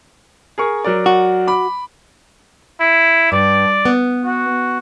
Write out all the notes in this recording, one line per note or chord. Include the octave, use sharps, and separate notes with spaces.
G#4 A#4 C#6
F#3 A#4 D5
F#4
B5 D6
E4
G2 D5
B3
F#4